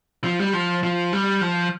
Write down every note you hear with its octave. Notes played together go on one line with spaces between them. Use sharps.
F3
G3
F3
F3
G3
F3